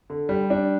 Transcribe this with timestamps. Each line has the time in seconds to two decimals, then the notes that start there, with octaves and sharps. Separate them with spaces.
0.10 D3
0.29 G3
0.50 D4